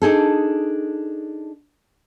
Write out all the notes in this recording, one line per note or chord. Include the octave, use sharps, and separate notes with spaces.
D4 D#4 G#4 A4